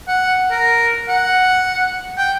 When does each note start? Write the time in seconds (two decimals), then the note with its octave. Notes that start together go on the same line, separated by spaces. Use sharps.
0.08 F#5
0.51 A#4
1.09 F#5
2.18 G5